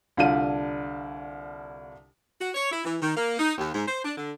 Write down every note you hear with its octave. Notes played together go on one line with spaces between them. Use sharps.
C2 D3 D4 F4 D5 D#7
F#4
C#5
E4
E3
D#3
A#3
D#4
D#2
G#2
C5
D4
D3